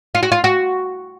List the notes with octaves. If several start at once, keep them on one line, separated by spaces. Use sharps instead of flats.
F4
F#4
F4
F#4